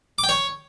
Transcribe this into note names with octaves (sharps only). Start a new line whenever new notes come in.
D6
G5
C#5